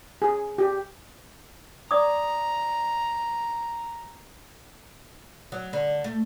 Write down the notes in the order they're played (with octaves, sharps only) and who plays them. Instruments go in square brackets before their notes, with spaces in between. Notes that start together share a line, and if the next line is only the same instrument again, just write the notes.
[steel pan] G#4
G4
[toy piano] D5 D6 D#6 [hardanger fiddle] A#5
[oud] F#3
D3
A3